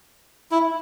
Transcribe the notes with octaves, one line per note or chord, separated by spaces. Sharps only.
E4